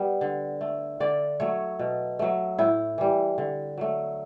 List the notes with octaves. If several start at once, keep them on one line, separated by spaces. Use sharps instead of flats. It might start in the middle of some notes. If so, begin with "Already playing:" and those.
Already playing: G3 B3
D3
A3
D3 D5
F#3 A3 C#5
B2
F#3 A3
A2 E4
E3 G3
D3
F#3 A3